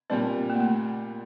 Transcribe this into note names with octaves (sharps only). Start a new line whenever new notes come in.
A#2 G3 C4 D4
A#3
A3
A#3